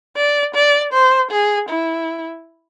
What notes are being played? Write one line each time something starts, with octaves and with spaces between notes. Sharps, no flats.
D5
D5
C5
G#4
E4